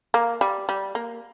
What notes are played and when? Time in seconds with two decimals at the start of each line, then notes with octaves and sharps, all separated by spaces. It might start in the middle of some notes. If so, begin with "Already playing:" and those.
0.14 A#3
0.41 G3
0.69 G3
0.95 A#3